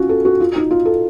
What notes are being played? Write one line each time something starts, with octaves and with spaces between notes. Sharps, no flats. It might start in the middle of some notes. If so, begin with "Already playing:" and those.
Already playing: C#4 F4 F#4
A4
F#4
F4
D#4
F4
A4